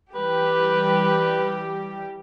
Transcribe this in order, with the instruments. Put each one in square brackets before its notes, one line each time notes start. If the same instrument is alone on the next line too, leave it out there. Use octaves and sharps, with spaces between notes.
[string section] E3 G3 G4 [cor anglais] B4